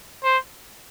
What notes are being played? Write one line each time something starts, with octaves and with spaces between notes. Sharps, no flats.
C5